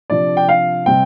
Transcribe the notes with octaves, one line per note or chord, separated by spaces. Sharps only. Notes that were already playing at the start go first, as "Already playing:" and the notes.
C3 F3 D4 D5
G5
F5
C3 G3 C4 G5